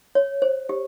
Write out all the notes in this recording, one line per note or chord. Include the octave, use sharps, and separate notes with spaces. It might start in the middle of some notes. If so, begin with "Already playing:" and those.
C#5
C5
G4